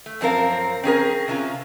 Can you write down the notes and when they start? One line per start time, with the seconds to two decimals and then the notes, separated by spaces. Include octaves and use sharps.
0.06 A3
0.21 F#2 F3 C4 A#4 F5
0.84 C4 C#4 G#4 A#4
1.28 C3 C#4 F4